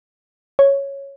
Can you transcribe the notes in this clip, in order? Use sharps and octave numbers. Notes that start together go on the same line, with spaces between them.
C#5